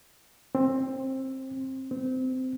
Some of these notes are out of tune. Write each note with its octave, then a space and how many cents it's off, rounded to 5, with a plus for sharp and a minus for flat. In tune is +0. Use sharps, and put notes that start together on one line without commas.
C4 +20
C4 -20